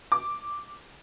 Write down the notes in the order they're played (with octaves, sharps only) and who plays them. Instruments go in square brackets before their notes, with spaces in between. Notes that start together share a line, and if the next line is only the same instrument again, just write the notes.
[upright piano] D6